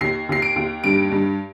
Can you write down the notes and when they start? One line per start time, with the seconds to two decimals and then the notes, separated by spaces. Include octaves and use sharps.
0.01 D#2 C7
0.29 D#2 C7
0.42 D7
0.56 D#2
0.84 G2 D7
1.12 G2